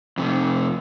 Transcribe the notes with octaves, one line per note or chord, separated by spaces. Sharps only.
F2 C3